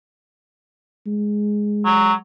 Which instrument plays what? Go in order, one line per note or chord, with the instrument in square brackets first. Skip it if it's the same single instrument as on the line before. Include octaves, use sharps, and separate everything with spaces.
[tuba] G#3
[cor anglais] F#3